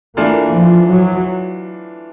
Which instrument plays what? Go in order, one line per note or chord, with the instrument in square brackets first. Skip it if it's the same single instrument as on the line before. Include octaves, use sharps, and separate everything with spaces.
[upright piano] E3 A3 D4 F4 [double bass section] A#3
[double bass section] F3
F#3